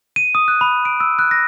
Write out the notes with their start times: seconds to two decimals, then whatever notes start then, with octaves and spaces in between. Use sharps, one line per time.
0.16 D#7
0.35 D#6
0.48 F#6
0.61 B5
0.85 D7
1.00 E6
1.19 F#6
1.31 A#6